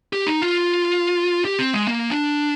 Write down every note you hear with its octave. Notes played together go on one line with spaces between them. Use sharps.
G4
D#4
F4
G4
C4
G#3
A#3
D4